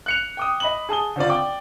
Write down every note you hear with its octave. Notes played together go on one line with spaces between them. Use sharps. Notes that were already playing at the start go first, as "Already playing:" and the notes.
F#6 C#7 F7
G5 D6 D#6
D#5 B5 F#7
G#4 A5 D#6 G7
D3 C4 F4 D5
D5 G5 D6